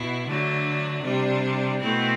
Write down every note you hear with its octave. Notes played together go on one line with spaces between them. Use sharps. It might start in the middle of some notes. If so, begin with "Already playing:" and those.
Already playing: B2 E4
D3 F#3 A3 D4
C3 G3 D4
B2 A3 C4 E4